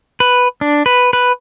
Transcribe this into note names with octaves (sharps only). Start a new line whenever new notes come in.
B4
D4
B4
B4